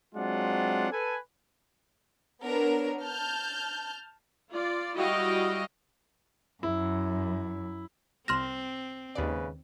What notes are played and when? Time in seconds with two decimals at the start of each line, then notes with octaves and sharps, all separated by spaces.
0.15 F#3 G#3 C4 D4 F4 F#5
0.91 A4 B4 G#5
2.43 B3 D4 A#4 C#5
3.03 A5 F6 G6
4.51 F4 D5
4.96 G3 E4 F#4 D#5 F5 G5
6.63 F#2 E4
8.28 C2 C4 C6 F6 F#6 A#6 E7
9.15 D#2 G#2 C#3 B4 D5